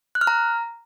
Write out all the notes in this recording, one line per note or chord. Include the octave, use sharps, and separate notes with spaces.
F#6
F6
A#5